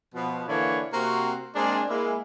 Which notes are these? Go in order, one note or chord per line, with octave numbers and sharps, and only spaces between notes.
B2 F3 B3
D3 E3 A#3 D4 E4 C#5
C3 A#3 C4 F#4
G#3 A#3 C4 D4 G#4 D5
G#3 A#3 E4